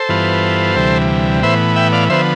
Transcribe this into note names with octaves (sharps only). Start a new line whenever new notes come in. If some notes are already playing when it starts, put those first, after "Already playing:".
Already playing: A4 C5
G2 E3 B3 F4
D2 C3 E3 G3
A2 E3 B3 C5 E5
E5 G5
D5 F5
D3 F3 B3 C5 E5